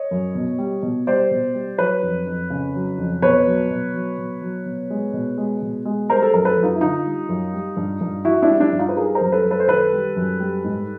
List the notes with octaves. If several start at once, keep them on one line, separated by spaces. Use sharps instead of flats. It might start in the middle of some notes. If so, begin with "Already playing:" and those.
Already playing: C#5 D#5
F#2
B2
G3
B2
G3 C5 D5
B2
G3
F#3 B4 C#5
F2
F2
C#3
F#3
F2
B2 B4 C#5
F#3
B2
F#3
B2
F#3
B2
G#3
B2
G#3
B2
G#3
G3 A#4 C5
A4
F#2 A#4
A4 B4
F#2
D#4 F4
E4
D3 D#4 F4
G3
F#2
G3
G2
G2
E3 E4 F#4
D4 E4
G3
D4 E4
G2
D#4 F4
B4
G3 G#4 A#4
A#4 C5
F#2
A4 B4
F#2
A4 B4
C5
D#3 A4 B4
G3
F#2
G3
G#2